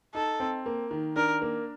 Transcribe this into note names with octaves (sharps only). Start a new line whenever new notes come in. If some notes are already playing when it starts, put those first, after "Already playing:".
D#4 A4
C4
A#3
D#3
D4 A#4
A#3